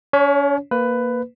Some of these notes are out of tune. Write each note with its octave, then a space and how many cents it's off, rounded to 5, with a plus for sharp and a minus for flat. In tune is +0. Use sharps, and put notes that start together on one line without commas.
C#4 +40 C#5 +0
A#3 +0 B4 +15